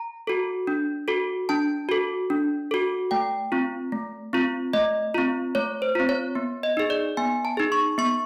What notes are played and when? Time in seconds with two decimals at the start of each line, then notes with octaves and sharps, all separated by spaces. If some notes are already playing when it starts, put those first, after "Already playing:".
Already playing: A#5
0.27 F#4 A4
0.67 D4
1.08 F#4 A4
1.49 D4 A5
1.89 F#4 A4
2.30 D4
2.71 F#4 A4
3.11 A3 G5
3.52 C4 F4
3.92 A3
4.33 C4 F4
4.73 A3 D#5
5.14 C4 F4
5.55 A3 C#5
5.82 C5
5.95 C4 F4
6.09 C#5
6.35 B3
6.63 D#5
6.77 D#4 G#4
6.90 D5
7.17 B3 G#5
7.45 A5
7.57 D#4 G#4
7.72 C#6
7.98 B3 C#6